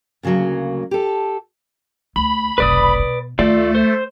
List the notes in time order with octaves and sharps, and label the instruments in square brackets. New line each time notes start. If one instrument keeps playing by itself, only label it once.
[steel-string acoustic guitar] D2 C#3 E3 F#3 A#3
G4 A4
[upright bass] D2 [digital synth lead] B5
[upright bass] F1 B1 [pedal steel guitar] B4 D5 D#6
[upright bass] B2
[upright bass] D2 D#3 [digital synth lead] A3 [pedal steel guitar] F4 D5
[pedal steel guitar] C5